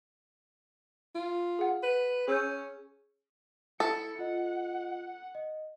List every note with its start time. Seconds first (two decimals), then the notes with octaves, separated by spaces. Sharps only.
1.15 F4
1.59 G#4 F#5
1.83 B4
2.28 C#4 G#4 E6 G6
3.80 E4 A4 C#7
4.19 F4 D#5 F#5
5.35 D#5